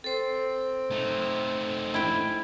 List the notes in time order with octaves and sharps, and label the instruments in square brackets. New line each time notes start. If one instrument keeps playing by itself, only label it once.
[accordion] C4 [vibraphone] A4 C5
[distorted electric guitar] A3 D#4
[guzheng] E4 G5